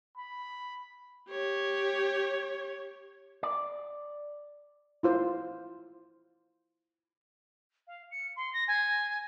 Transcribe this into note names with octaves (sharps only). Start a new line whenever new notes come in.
B5
G4 C#5
D5
E4 F4 C5
F5
C#7
C6
A#6
G#5